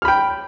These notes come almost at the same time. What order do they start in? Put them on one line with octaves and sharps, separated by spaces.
F6 B5 G5